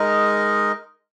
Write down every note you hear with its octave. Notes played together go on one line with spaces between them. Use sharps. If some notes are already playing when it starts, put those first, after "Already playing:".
Already playing: G#3 D#4 A#4 D#5